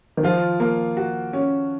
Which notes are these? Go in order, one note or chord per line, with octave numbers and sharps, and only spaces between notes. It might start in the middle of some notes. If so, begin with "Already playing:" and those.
D#3
F3 F4
A#3
F#4
C#4